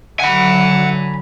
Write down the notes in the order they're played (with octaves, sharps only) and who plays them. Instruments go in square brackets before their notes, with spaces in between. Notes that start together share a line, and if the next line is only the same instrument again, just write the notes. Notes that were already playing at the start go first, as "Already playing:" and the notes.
[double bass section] D3 F#3 [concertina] F#5 [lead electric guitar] G#5 B5